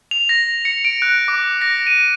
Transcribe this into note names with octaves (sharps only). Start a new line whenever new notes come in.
F7
A#6
C#7
D7
F#6
D6
A#6
D#7